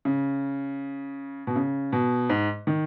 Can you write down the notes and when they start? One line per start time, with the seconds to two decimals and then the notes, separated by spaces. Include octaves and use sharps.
0.05 C#3
1.47 B2
1.56 C#3
1.93 B2
2.29 G#2
2.67 D#3